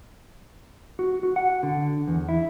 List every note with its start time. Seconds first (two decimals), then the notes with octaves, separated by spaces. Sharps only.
0.99 F#4
1.23 F#4
1.36 F#5
1.63 D3
2.08 E2
2.29 E4